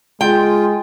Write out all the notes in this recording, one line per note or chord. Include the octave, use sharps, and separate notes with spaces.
G#3 F4 G5